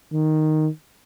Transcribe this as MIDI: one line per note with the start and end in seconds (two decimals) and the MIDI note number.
0.13 0.68 51